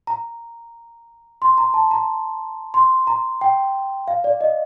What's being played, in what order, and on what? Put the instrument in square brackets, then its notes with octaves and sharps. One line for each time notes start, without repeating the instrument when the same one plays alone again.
[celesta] A#5
C6
A#5
A5
A#5
C6
A#5
G5
F5
D5
D#5